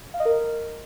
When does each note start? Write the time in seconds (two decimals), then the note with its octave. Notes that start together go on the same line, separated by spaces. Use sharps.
0.14 F5
0.20 D#5
0.25 A#4